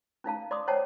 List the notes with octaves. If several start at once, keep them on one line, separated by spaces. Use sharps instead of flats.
C#4 D#4 F5 A5
D5 C6 D6 D#6
C5 C#5 D#5 F#5 G5 A5